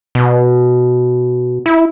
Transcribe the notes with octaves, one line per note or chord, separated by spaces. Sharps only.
B2
E4